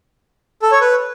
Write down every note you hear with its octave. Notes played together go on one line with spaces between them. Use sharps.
A4
C#5
B4